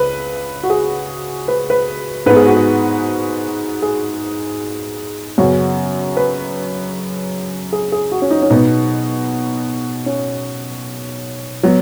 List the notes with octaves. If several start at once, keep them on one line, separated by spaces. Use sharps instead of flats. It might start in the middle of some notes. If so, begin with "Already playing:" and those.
Already playing: C#2 B4
F#4
G#4
B4
B4
G#2 G#3 B3 B4
G#4
F#4
G#4
G#4
F#2 C#3 B3 F#4
B4
G#4
G#4
F#4
C#4
D#4
C#4
B2 B3 D#4
C#4
F#3 B3